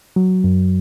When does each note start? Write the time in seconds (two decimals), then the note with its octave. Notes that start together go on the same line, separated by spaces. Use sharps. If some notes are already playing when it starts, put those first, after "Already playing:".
0.16 F#3
0.44 F#2